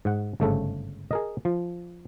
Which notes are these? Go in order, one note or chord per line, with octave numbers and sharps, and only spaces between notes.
G#2 F#5
G1 G#2 C#3 A3 A4
G#4 A#4 D#5
F3